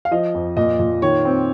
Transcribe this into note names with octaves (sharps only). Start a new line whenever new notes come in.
F5
F3 D#5
F2
A#2 D#5
A#2
D#3 C#5
C4